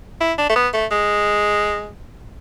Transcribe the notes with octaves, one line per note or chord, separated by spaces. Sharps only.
E4
D4
A3
B3
A3
G#3